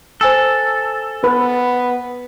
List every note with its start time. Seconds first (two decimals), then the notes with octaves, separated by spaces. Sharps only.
0.21 A4 C5 G#5 E6
1.24 B3 B4